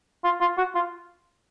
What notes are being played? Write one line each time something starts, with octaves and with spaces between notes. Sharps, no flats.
F4
F4
F#4
F4